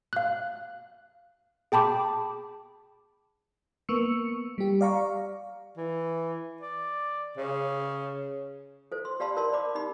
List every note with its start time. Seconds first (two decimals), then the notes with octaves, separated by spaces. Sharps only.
0.13 F5 F#6
1.72 G#4 G5 A5 B5 D6
3.89 A#3 B3 C#6 E6 C#7
4.58 G3 G4
4.81 D5 F5 A#5 C#6
5.77 E3
6.61 D5
7.38 C#3
8.92 A4 C5
9.05 C6
9.20 G4 D5 F5 A5 B5 C6
9.37 A#4 D5 A5 C6
9.53 D5 B5 D6
9.75 D#4 G4 B5